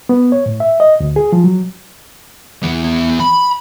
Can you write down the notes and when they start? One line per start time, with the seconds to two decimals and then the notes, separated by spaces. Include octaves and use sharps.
0.09 B3
0.32 C#5
0.46 A2
0.60 E5
0.80 D#5
1.00 D2
1.16 G#4
1.32 F3
1.44 F#3
2.63 E2 B3
3.20 B5